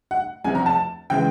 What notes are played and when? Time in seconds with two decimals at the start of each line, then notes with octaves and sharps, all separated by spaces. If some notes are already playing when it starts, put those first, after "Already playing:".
0.11 F#5
0.44 E2 C3 F3 G#5
0.55 A#5
0.66 A5
1.10 C#3 E3 G#3 G5